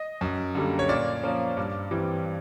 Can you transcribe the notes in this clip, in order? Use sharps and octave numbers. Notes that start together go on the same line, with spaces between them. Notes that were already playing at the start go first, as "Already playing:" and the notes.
Already playing: D#5
F#2
D3 G3 A#3
C#5
A#2 D5
F3 A#3 C#4
G2
E3 G3 C4